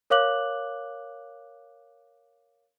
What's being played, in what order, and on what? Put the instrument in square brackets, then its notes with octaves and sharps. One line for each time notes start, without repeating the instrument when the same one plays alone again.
[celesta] A#4 C#5 F5 D6 F#6 F#7